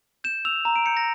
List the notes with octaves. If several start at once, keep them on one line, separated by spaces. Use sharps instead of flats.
G6 E7
E6 F7
A#5 E7
D7
G6 C#7
A#6